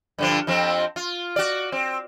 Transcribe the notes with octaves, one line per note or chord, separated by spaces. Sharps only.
G2 D3 F3
F2 F3 C4
F4
F#4 D5
C4